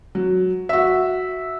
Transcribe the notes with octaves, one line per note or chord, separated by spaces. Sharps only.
F#3
F#4 E5